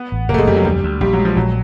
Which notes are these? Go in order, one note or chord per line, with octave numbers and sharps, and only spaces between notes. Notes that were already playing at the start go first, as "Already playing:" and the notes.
Already playing: B3
A1
F1 A#3
A3
G#3
F1 G3
F#3
D2 G3
D2
A#1 G3
F#3
G#3
F3
A#1 F#3